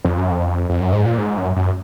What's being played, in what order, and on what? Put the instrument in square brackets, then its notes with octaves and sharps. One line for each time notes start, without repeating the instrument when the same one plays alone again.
[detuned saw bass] F2
F#2
F2
F2
F#2
G#2
A#2
G#2
F#2
F#2